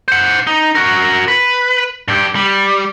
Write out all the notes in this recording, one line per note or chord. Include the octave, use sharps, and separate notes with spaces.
C5 F#5
D#4
F#4 A#4
B4
G2 G4
G3